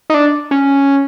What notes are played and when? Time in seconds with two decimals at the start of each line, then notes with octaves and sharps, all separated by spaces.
0.10 D#4
0.14 D4
0.51 C#4